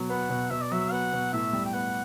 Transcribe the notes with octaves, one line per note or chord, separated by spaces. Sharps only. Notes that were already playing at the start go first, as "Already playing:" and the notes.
Already playing: B2 F#3
B3 F#5
B2
B2 E5
D5
F#3 E5
B3 F#5
B2
A2 E5
G3
G5
B3 F#5